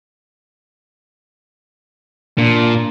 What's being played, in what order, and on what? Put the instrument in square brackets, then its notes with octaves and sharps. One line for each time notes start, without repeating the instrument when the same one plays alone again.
[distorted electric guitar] A#2 [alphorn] D4